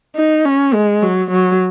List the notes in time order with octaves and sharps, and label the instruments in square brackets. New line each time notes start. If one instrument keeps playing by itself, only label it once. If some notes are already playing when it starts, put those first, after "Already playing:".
[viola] D#4
C#4
G#3
F#3
F#3